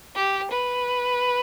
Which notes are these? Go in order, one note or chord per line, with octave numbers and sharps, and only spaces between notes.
G4
B4